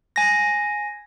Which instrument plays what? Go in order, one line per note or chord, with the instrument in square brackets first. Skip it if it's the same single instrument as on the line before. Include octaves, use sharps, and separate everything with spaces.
[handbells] G#5 A#6